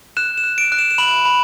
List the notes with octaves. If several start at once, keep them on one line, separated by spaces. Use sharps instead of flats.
F#6 E7
E7
F#6
D7
F#6
E7
E7
B5 F#7
B5